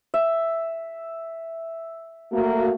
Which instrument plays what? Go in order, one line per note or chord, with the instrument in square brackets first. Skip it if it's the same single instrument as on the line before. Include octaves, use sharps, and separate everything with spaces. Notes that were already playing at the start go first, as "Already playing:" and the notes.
[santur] E5
[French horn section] A3 A#3 F#4